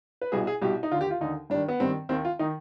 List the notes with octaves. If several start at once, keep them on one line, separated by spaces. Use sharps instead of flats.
B4
C2 B2 G#4
G#4
C2 B2 G4
D#4
D#2 D3 F4 G4
F4
D#2 D3 D#4
G2 D#3 D4
B3
G2 D#3 C4
D#2 D#3 C4
F4
D#3 D#4